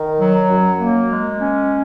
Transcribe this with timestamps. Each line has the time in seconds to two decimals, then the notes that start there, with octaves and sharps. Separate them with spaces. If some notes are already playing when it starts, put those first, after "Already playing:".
Already playing: D#3
0.20 F#3
0.50 F#2
0.80 A#3
1.10 G#3
1.40 C#4